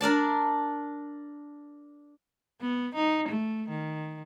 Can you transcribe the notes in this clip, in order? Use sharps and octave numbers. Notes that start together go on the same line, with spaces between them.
D4 A#4 D5 A5
B3
D#4
A3
D#3